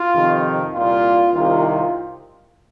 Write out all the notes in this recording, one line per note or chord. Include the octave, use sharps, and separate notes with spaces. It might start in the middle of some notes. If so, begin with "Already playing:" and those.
Already playing: F4
F2 C3 D#3
C2 A#2 F4
C2 C3 D#3 F4
F4